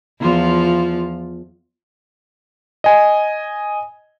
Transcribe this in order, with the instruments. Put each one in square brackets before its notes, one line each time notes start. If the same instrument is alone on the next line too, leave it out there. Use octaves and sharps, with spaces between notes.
[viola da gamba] E2 F3 F4
[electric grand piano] D#5 G#5